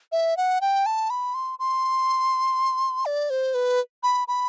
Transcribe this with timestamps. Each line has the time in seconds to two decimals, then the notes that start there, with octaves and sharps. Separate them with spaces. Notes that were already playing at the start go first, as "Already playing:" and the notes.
0.12 E5
0.37 F#5
0.61 G5
0.86 A5
1.10 B5
1.34 C6
1.59 C6
3.06 D5
3.30 C5
3.54 B4
4.03 B5
4.28 B5